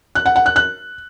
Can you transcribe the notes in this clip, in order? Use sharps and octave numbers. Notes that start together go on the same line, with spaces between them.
F#6
F#5
F#5
F#6
F#6